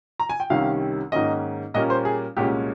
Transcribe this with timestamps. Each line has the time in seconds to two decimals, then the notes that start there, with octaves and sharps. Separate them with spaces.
0.20 A#5
0.30 G#5
0.40 G5
0.50 C2 C3 D#3 G3 C#4 F5
1.12 G#2 D#3 A#3 C#4 D#5
1.74 A#2 G3 A#3 C#4 D#5
1.90 C5
2.05 G#4
2.36 C2 A#2 G#3 C#4 G4